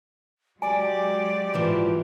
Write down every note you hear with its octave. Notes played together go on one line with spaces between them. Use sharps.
F#3 G#3 G4 D5 G#5
G#2 E3 F3